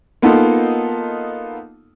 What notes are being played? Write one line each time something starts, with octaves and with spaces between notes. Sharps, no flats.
A#3 B3 D#4 F4 A4